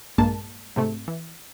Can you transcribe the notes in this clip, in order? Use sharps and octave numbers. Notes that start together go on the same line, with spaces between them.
A#1 G2 G#3 A#3 A5
G#2 C3 A3
E3